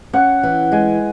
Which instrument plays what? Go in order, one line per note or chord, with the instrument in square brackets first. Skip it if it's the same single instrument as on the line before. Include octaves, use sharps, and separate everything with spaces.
[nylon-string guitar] C#4 [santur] F#5
[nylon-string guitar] E3
[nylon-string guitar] G#3 [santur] G#5